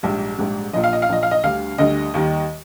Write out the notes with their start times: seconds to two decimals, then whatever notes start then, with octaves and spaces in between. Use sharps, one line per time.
0.03 A#1 G#2 G3
0.38 A#1 G#2 G3
0.73 A#1 A#2 F3 D#5
0.84 F5
0.93 D#5
1.02 F5
1.09 A#1 A#2 F3 D#5
1.23 F5
1.31 D#5
1.43 D2 D3 G3 F5
1.78 D2 D3 G3 D#5
2.14 D#2 D#3 G3